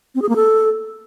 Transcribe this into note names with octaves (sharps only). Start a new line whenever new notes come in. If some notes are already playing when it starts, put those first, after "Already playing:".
C4
G#4
A#3
A4